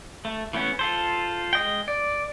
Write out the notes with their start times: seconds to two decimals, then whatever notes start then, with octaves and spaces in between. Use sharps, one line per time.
0.25 A3
0.53 E3 A3 B3 C#4
0.79 F4 A4 C5
1.53 G#3 D#5 G5
1.88 D5